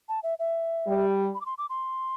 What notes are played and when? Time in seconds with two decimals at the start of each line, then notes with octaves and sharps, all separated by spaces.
0.09 A5
0.23 E5
0.39 E5
0.87 G3
1.34 B5
1.41 D6
1.46 C6
1.58 D6
1.70 C6